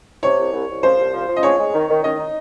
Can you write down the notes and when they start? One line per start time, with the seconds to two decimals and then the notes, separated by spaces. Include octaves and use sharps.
0.23 C3 C#5
0.38 C2
0.53 C2
0.68 C2
0.83 F3 C5
0.98 C2
1.13 F3
1.28 F3
1.36 D#5
1.43 G#3 C#5
1.58 G#3
1.74 D#3
1.89 D#3
2.03 D#3 D#5
2.19 D#4